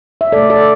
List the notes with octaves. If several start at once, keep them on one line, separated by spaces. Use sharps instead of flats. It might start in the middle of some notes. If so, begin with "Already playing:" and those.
E5
B2 A3 A4 D5
A4 D5